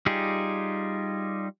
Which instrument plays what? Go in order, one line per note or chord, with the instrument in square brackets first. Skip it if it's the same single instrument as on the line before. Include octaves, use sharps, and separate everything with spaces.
[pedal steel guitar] G3 D#4 F4 G4 G#4